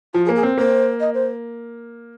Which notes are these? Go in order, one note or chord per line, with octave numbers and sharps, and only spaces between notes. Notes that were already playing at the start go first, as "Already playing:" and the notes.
F3 F4
G#4
A#3
G#4
C4 A#4
A#3 C5
D#5
C5